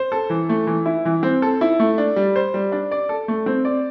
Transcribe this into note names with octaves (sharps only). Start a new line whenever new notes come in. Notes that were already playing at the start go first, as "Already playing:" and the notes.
Already playing: C5
A4
E3
A3
E3
E4
E3
C4
A4
E4
A3
D4
G3
C5
G3
D4
D5
A4
A3
C4
D5